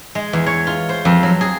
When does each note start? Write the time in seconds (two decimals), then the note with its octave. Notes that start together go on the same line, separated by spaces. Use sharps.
0.15 G#3
0.33 E2
0.46 C#5
0.67 F4
0.89 C5
1.05 F2
1.23 F#3
1.41 G#4